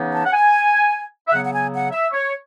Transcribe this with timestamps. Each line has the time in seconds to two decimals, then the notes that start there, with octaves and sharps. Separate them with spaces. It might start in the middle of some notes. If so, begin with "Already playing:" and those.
Already playing: C#3 E3 B3 D#4
0.11 A5
0.25 F#5
0.32 G#5
1.28 E5
1.31 C#3 F#3 B3 F#5
1.43 F#5
1.51 G#5
1.72 F#5
1.92 E5
2.12 C#5